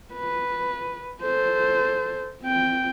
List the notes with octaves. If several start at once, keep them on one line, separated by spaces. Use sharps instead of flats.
B4
A4 C5
C4 G5